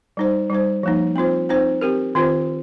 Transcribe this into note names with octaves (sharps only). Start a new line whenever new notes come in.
G3 D#4 C5
G3 D#4 C5
F3 A#3 D#4
C4 F4 C5
C4 D#4 C5
C4 G4 A#4
D#3 C4 F4 C5